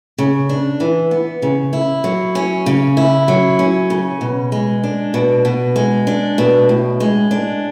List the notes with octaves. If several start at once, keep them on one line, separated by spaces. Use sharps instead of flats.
C#3
D4
E3
B3
C#3
E4
F#3
C#4
C#3
E4
F#3
C#4
C#3
B2
G#3
D4
B2
B2
G#3
D4
B2
A2
G#3
D4